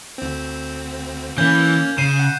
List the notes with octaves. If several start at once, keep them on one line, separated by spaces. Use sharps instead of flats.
D2 C4
E3 A#3 C#4 G6
C#3 C7 D#7 E7
F#5